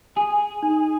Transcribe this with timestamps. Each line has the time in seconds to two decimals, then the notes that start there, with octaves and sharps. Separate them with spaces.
0.16 G#4 G#5
0.63 D#4